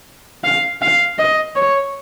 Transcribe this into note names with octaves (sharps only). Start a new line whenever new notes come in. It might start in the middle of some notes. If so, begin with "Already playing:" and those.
F5
F5
D#5
C#5